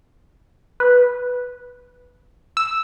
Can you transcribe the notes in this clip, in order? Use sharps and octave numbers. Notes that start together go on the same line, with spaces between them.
B4
E6